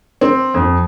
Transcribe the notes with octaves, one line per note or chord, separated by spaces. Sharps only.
C4
F2